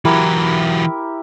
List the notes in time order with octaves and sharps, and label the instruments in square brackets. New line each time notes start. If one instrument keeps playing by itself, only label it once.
[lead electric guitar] E3 F#3 [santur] E4 G4 A#4